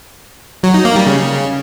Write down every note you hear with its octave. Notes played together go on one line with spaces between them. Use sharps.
F#3
D#4
A#3
G3
C#3